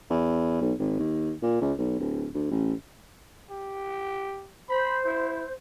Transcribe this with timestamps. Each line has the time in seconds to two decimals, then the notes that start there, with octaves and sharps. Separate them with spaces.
0.10 E2
0.61 B1
0.79 G#1
0.99 D#2
1.42 A#2
1.61 C#2
1.78 B1
1.99 D1
2.34 D2
2.51 A1
3.50 G4
4.69 C5 B5
5.05 E4